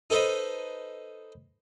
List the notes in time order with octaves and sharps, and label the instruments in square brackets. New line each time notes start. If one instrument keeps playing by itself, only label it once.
[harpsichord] D#4 A4 B4 C5 D#5